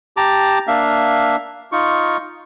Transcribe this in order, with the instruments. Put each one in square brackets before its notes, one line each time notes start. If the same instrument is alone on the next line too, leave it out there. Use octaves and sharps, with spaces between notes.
[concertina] G4 A5 A#5 D6
A#3 D4 E5 F5
D#4 F4 C#6